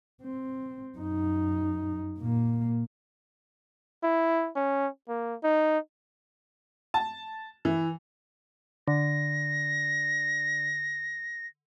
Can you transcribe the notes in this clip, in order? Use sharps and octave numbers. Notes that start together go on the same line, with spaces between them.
C4
F#2 D#4
A#2 A#3
E4
C#4
A#3
D#4
A5
E3
D3 A#6